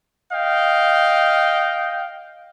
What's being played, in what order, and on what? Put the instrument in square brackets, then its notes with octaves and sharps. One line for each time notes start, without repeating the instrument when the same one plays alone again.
[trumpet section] D#5 F5 G5